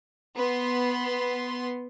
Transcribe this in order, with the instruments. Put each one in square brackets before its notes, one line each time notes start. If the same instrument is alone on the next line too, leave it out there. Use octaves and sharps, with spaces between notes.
[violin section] B3 C6